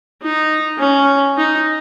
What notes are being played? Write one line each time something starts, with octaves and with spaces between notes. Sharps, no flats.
D#4
C#4
D#4